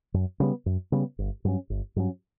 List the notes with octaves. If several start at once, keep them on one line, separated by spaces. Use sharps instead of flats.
F#2
C#3 G3 B3
F#2
C#3 G3 B3
G1
G2 F#3 C#4
G1
G2 F#3 C#4